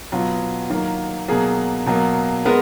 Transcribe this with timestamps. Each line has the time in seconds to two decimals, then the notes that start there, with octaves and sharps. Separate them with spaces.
0.12 B2 F#3 B3 F4
0.70 D#3 F#3 A#3
1.28 B2 F#3 A#3 G#4
1.86 B2 F#3 A#3
2.45 G#3 B3 A#4